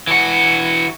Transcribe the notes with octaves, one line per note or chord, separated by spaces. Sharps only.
E3 F#4